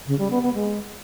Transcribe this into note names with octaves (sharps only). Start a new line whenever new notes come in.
C#3
G3
B3
B3
G#3